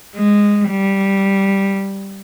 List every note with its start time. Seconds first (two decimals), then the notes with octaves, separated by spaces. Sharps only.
0.15 G#3
0.70 G3